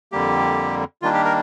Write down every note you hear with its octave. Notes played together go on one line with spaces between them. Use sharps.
F2 D3 G3 A#3 G4
D#3 G3 A#3 D4 F4
G4
A#4